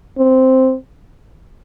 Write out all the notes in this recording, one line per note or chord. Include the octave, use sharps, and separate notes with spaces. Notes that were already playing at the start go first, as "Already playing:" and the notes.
C4